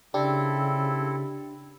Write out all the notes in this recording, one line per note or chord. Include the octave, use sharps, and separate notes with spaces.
C#3 C4 D4 E4 G4 A4